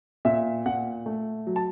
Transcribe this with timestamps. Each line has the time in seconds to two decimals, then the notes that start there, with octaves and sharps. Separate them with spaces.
0.25 A#2 E5
0.66 A#2 F#5
1.06 A3
1.47 F#3
1.56 A5